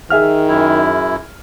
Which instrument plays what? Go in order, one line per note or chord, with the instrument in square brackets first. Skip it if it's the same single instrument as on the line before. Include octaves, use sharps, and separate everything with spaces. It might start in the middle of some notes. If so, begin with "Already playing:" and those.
[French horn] D#3 [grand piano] G#4 E5 F6
[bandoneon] F#2 E4